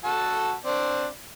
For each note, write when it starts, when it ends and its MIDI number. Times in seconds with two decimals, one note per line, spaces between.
0.04 0.54 66
0.04 0.54 81
0.04 0.54 88
0.65 1.07 60
0.65 1.07 62
0.65 1.07 74